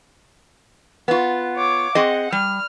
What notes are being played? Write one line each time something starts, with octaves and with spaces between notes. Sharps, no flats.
B3 F4
C#5 D6
C4 G#4 D#5 F#5
G3 F6